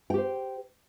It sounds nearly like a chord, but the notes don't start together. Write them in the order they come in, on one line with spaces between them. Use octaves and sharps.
G5 G4 C5